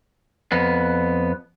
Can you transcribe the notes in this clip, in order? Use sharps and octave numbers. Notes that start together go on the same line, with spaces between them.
F2 B3